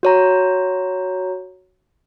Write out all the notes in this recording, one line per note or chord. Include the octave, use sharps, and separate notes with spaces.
F#4 C#5 A#5